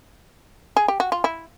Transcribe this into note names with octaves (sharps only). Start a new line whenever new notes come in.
G#4
G4
F#4
F4
E4